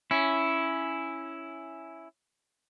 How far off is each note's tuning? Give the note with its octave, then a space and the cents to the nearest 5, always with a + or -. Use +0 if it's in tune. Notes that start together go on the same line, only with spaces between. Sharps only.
C#4 +0 E4 +0